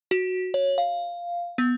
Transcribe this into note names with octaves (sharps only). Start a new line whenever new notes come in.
F#4
C#5
F5
B3